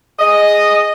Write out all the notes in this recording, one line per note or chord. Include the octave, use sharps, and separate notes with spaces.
G#4 D#5